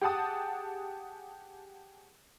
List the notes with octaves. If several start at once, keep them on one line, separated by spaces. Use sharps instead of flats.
G4 G#4 F#5 A5 D#6